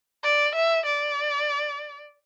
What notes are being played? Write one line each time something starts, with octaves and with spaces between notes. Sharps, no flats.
D5
E5
D5